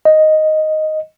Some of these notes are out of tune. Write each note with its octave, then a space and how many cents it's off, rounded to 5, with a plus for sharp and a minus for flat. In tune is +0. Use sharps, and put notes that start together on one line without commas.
D#5 +0